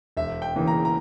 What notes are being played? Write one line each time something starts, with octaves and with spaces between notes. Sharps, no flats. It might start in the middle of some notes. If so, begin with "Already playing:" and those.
E1 E5
G5
E2 C#3 E3 A#3
A#5
A#5